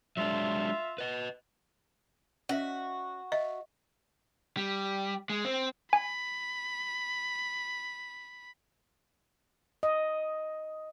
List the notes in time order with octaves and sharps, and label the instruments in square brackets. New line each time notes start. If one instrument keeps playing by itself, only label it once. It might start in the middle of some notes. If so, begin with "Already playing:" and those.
[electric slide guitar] F#3 G#3 D4 [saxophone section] F4 E5
[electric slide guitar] B4 D#5
[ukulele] C#4 D#5 E5 [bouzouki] F#4
[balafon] D#5 [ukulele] E5
[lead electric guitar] G3
G#3
C4
[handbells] G#5 [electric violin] B5
[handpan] D#5